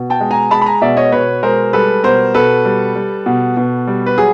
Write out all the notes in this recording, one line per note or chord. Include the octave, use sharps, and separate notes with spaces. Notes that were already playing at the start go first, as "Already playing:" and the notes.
Already playing: B2
G5 A5
G#3
G#5 A#5
G#3 A5 B5
B5
G#5 A#5
B2 D5 E5
C#5 D#5
B2 B4 C#5
G#3 A#4 C5
G3 A4 B4
B2 A#4 C5
B2 A4 B4
G3
G3
B2
B2
G3
B4
F#3 G#4